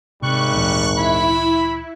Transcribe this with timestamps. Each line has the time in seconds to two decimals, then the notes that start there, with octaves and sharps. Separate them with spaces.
0.22 G#1 C3 G3 C#6 F#6
0.54 D2 A#2 E3
0.97 E4 B5